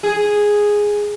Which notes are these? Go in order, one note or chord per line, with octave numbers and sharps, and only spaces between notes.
G#4